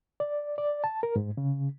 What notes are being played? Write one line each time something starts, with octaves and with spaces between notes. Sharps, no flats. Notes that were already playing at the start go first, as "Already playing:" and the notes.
D5
D5
A5
A#4
G#2
C#3